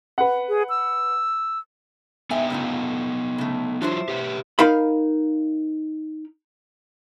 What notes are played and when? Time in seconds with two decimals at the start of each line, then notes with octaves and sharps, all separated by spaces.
0.18 B4 F#5
0.49 G#4
0.69 E6
2.31 B3 D#4 E5 G5 G#5
2.50 C#3 A3 F4
3.38 C#3 A3
3.82 F#3 D4 E4 F4 C5
4.08 G4 B4 E5
4.59 D#4 A#4 F5 B5